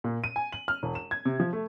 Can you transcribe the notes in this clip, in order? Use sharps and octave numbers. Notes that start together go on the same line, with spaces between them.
A#2
D#7
G#5
F#7
F6
E1
E7
G#6
C3
F3
A3